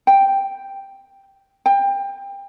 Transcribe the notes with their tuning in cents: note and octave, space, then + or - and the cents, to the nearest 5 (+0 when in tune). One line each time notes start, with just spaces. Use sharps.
G5 +0
G5 +25